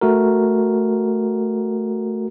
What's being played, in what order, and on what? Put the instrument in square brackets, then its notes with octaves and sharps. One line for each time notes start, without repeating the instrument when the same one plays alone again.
[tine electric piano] A3 F#4 A#4